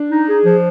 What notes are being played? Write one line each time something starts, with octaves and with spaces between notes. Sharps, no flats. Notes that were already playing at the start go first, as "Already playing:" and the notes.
Already playing: D4
D#4
G#4
F3